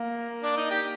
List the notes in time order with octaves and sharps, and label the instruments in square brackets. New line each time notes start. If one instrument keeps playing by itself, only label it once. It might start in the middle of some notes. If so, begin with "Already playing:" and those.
Already playing: [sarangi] A#3
[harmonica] D4 D5
D#4 D#5
G4 G5